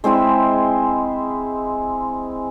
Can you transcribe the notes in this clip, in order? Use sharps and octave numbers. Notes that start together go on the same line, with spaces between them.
G#3 C4 E4 E5